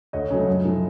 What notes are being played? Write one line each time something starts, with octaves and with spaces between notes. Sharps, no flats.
D2 C#5 D#5
C#3 F#3 A3
F#2
C#3 F3 A3